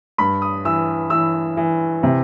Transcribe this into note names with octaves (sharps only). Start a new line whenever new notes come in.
G2 B5
D#6
E3 E6
E3 E6
E3
C3